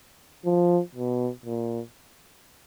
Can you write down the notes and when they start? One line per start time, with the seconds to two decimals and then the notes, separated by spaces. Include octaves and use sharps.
0.46 F3
0.95 B2
1.45 A#2